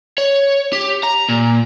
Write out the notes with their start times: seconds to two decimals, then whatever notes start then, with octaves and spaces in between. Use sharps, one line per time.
0.18 C#5
0.73 G4
1.03 A#5
1.29 A#2